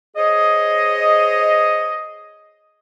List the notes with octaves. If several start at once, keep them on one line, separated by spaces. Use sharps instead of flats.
G#4 C5 C#5 D#5